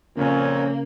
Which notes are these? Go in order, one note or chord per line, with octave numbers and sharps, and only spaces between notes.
F2 A#2 C#3 A#3 C#4